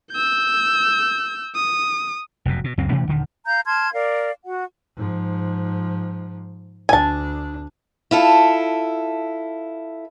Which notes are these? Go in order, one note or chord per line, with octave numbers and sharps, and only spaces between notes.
E6 G6
D#6
F1 F#2 B2
B2
C#2 F#2 G#3 C4
B2 E3 A3 C#4
D#1 D3 D#3
F5 A#5 G6
A5 C6 F6 G#6
A#4 D5 F5
F#4 F#5
G#2 F3
D2 D4 G#5 A5
E4 F4 A4